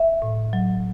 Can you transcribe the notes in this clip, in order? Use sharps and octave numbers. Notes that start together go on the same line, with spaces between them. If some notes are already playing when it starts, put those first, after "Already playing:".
Already playing: E5
A2
F#3